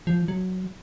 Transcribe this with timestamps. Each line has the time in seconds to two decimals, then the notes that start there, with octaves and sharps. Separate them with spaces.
0.07 F3
0.28 F#3